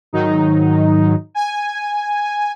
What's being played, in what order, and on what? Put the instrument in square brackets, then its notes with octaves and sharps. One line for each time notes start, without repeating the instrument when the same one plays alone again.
[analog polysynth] G#2 D#3 F#3 D#4
G#5